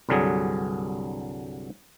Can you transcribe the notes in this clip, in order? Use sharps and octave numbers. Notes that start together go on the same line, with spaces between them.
C2 G2 D3 F#3 G#4